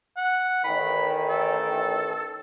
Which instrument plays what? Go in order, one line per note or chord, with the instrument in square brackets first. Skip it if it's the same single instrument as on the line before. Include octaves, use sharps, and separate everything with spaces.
[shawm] F#5
[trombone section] A1 D#3 [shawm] B5
[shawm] A4